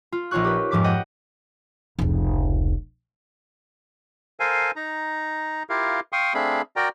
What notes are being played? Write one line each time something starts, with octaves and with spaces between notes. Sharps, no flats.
F4
A#1 D#4 F4 C#5 C#6 F#6
G4 B4
F2 G#2 F3 D6 B6
G4 D#5 F#5 G5
F1 C#2
A4 A#4 C5 F5 G#5
D#4 A#5
E4 F4 G4 A#4 F5
F5 G5 C6 C#6 D#6
A3 C4 D4 G#4 F5 B5
F#4 A#4 D5 G5 A#5